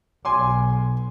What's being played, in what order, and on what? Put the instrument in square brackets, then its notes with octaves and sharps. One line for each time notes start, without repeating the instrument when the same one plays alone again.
[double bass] B1 [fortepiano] G#5 C6 D6